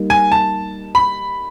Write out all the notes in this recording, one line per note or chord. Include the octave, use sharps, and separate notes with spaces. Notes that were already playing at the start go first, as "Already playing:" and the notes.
Already playing: G3 A#3 D#4
G#5
A5
B5